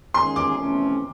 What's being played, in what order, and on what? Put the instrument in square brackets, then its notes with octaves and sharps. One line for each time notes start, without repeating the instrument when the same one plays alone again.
[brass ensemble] D#3 G#3 C#4 F4 G#4 [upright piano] C6
[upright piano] D6
[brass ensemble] F2 C3 E3 A3 C#4